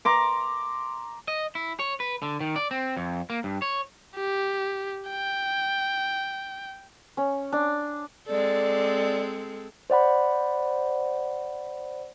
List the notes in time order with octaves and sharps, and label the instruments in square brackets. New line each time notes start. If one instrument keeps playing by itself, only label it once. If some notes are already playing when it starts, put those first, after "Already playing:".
[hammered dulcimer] A#5 C6 D6
[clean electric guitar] D#5
E4
C#5
B4
D3
D#3
D5
C4
F2
A#3
G2
C#5
[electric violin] G4
G5
[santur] C#4
D4
[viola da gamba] G#3 C4 A4 [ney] D5
[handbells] C5 D5 F#5 B5